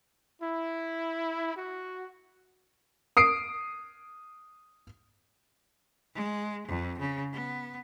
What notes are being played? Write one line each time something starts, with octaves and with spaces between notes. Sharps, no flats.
E4
F#4
D#6 C7 D7
G#3
F2
C#3
B3